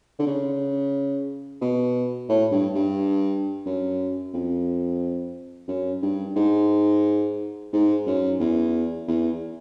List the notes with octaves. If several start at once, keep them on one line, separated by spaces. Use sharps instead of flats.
D3
C#3
B2
A2
G2
G2
F#2
F2
F#2
G2
G#2
G#2
F#2
E2
E2